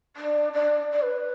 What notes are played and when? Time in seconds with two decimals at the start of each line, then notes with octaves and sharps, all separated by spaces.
0.16 D4
0.53 D4
0.92 D5
1.02 B4